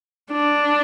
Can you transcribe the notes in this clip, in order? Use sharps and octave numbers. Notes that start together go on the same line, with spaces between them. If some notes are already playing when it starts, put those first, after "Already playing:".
D4